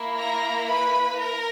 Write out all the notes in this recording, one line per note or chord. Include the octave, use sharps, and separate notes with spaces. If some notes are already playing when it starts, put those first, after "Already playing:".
Already playing: A#3 E4
A#4 A#5
B4 B5
A#4 A#5